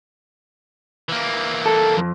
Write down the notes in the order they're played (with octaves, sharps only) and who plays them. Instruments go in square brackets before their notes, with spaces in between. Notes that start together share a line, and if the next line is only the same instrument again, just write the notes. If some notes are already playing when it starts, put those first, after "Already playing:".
[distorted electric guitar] E3 A#3
[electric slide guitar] A4
F2